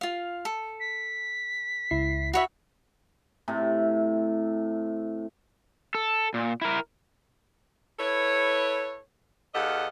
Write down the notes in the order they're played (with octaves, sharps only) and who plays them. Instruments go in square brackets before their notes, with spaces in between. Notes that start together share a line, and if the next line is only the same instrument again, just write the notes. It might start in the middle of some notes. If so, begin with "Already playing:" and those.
[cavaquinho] F4 F5
A4
[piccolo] B6
[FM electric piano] C#2 E4 C7
[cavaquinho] F#4 C#5 E5 [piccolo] B5
[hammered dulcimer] A2 C3 C4
[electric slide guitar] A4
A#2
E4 A#4
[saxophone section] E4 A4 B4 C#5
E2 G4 A4 D#5 F5 F#5